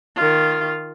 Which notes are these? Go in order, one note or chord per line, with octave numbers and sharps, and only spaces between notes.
D#3 F4